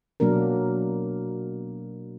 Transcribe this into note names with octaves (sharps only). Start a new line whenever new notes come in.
B2 F#3 A#3 D4 A#4